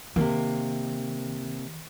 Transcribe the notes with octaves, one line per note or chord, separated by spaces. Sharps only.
C3 D#3 A#3